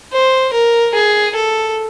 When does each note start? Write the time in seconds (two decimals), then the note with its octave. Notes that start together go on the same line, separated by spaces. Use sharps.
0.13 C5
0.53 A#4
0.94 G#4
1.35 A4